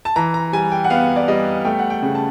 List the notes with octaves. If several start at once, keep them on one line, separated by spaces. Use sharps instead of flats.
A5
E3 A#5
A#5
G3 G#5
G5
F#5
B3 F5
D5
G3 D#5
A3 G5
F#5
G5
C#3
A5